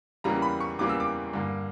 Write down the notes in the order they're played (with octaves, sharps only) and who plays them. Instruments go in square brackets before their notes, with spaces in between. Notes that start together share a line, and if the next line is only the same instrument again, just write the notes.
[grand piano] E2 C#3 E3 G3 A#3 A#5
B5
C#6
E2 C#3 E3 G3 A#3 D6
E6
D6
G2 D3 A#3